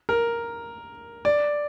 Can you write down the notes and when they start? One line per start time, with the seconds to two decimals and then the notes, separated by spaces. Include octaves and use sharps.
0.09 A#4
1.25 D5